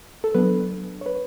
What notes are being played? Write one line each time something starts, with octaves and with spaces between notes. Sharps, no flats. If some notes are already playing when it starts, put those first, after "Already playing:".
A4
F#3 B3 D4 B4
C#5
B4